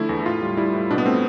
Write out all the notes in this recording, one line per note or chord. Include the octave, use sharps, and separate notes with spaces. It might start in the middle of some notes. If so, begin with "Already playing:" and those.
Already playing: D3 F3 A3 E4
E2
A2 F4
G3
G3 E4
A2
B2 D4
B3
A3 C4